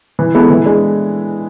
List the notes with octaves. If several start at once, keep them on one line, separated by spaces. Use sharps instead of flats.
E3
G#3 B3 E4 A4
E3
G#3 D4